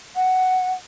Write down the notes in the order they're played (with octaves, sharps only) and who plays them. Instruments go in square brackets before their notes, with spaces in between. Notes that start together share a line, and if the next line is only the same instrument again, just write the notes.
[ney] F#5